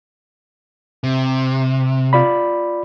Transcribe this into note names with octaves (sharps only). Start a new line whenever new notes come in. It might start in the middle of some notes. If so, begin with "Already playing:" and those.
C3
F4 D5 B5